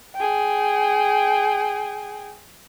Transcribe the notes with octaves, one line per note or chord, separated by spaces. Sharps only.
G#4 G5